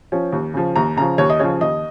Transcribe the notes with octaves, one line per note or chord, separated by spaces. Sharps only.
F3 C#4
D#2
C#3 F3
D#2 A#5
C#3 F3 A#5
D#2 C#5
D#5
C#3 F3 C#5
D#2 D#5